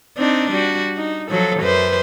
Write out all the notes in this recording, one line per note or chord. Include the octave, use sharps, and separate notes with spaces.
C4 D4 D#4
G3 F#4
D#4
F3 F#3 A4
F#2 B4 C5